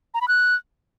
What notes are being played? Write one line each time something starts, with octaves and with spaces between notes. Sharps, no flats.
A#5
B5
F#6